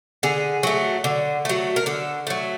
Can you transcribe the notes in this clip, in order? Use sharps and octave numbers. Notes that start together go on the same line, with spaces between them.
D3 G#4
F#3 A3
D3
F#3 A3
A#4
D3 A4
F#3 A3